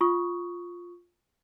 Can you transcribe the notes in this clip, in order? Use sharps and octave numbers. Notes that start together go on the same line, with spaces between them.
F4 C#6 D#6